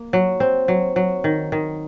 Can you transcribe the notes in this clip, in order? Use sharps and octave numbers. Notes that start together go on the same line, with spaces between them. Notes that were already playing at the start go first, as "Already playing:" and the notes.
Already playing: A#3
F#3
C4
F#3
F#3
D#3
D#3